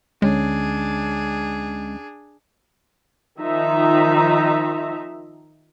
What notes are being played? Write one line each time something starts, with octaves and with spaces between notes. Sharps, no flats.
D2 D3 G#3 C#4 D4 G#4
D#3 F3 D#4 E5 A#5